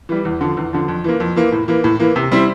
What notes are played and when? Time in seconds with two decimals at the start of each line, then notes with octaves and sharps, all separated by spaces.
0.09 E3 G3
0.25 E2
0.41 D3 F3
0.57 E2
0.73 D3 F3
0.88 F2
1.04 E3 A#3
1.20 F2
1.36 E3 A#3
1.52 A2
1.68 E3 A#3
1.84 A2
2.00 E3 A#3
2.16 C3
2.32 G3 C4 E4